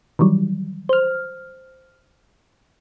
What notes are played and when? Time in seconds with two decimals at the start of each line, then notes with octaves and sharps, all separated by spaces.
0.19 D#3 E3 F#3 G3
0.89 C5 F6